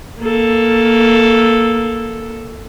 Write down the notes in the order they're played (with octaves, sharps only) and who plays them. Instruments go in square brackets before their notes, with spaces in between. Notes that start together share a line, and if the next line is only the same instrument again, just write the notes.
[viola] A#3 A4